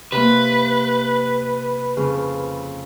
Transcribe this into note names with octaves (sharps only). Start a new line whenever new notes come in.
C3 A#3 B4
F2 C#3